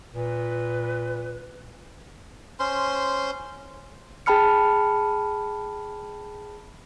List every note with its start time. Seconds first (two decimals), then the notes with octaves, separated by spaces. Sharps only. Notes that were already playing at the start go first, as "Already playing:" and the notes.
0.14 A#2 B4
2.59 C#4 C5 C6
4.26 G#4 G5 A5 B5 F6 C#7